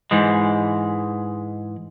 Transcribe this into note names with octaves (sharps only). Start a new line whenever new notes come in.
G#2 E3 G#3